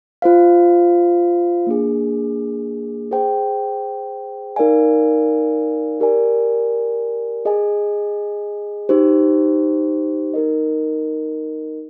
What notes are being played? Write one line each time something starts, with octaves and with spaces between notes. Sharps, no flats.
F4 C5 F5
A#3 D4 G#4
G#4 C5 G5
D#4 A#4 D5 F5 G#5
G4 A#4 D5 G#5
G#4 D#5 G#5
D#4 G4 C5
D#4 A#4 D#5